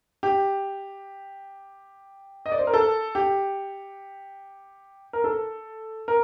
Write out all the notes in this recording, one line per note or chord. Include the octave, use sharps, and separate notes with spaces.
G4
D#5
D5
C5
A#4
A4
G4
A#4
A4
A#4